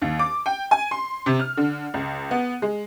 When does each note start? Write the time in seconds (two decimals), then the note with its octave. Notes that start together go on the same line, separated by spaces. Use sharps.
0.02 D#2
0.19 D6
0.46 G5
0.71 G#5
0.91 C6
1.26 C3
1.39 F6
1.57 D3
1.94 C#2
2.31 B3
2.62 G#3